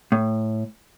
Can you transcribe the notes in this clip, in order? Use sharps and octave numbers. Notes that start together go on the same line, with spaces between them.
A2